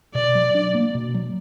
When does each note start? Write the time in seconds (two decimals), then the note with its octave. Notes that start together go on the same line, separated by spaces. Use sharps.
0.15 B2 D5
0.35 F#3
0.54 D4
0.75 A#3
0.94 B2
1.14 F#3